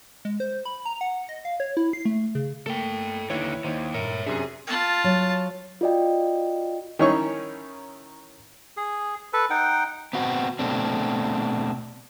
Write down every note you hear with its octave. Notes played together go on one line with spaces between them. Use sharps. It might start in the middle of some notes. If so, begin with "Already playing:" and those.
G#3
C5
B5
A#5
F#5
D#5
F5
C#5
E4
C7
A3
C#3
A3 A#3 A4 G5
D#2 D3 D#4 E4 B4 C#5
D#2 D#4 C5
G2 A#2 A#4 C#5 E5
F#2 C3 D4 G#4 E5
F4 A5
F#3
F4 F#4 D5 D#5 G5
D#3 C#4 D#4 E4 C#5 C#6
G#4
A4 B4
D#4 F#5 G5
B3 C4 F#4
B2 A3 C4 D4